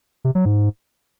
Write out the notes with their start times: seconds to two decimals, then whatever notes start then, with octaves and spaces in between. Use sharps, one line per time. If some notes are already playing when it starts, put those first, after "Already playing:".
0.24 C3
0.35 F#3
0.45 G#2